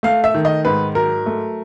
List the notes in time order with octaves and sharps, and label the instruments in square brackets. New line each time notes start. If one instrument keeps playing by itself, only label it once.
[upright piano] A3 F5
E5
D#3
D#5
G#2 B4
F#3 A#4
A3